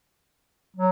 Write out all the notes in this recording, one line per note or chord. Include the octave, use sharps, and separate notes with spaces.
F#3